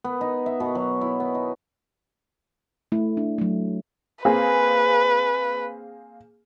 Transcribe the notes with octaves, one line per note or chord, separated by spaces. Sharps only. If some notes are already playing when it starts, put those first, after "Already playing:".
B3
D#4
E5
B2
F#3
E4
B3
D#4
A3 E4
D4
F#3 A3
A#3 C4 G#4 B4